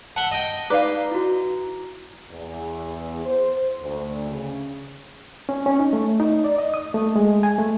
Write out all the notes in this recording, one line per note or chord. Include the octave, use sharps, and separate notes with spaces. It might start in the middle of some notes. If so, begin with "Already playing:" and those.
E5 F#5 A5 G7
D#5 G5
D#4 B4 D5 F5 A#5 D6
E4 F#4
E2
C5
D2
C#3
C#4
C#4
D#4
A3
D#4
D5
D#5
D#6
A3
G#3
G#5
A3